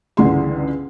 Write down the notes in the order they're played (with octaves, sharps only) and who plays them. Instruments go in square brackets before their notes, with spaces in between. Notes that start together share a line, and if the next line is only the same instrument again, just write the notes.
[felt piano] G1 C#2 D3 E3 G#4 C6